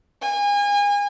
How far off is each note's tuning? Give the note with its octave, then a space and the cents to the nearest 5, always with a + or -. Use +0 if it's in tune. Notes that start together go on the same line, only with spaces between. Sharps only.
G#5 -35